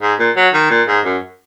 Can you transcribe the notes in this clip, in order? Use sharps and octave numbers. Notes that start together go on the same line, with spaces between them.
G#2
A#2
F#3
D#3
A#2
G#2
F#2